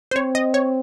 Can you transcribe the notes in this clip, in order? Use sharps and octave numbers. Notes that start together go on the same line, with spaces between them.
C5
C4 C#5
D#5
C#5